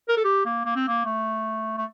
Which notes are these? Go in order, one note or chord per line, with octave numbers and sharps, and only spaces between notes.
A#4
A4
G4
A#3
A#3
C4
A#3
A3
A3